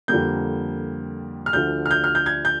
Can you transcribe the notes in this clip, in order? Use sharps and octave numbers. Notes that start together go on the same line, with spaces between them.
F2 D3 G3 A#3 G6
F6
D2 D3 F3 G6
F6
G6
F6
G6
G#6
G6